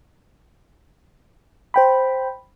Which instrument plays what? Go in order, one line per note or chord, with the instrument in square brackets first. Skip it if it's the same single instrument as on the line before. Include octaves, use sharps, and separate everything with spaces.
[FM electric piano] C5 G5 B5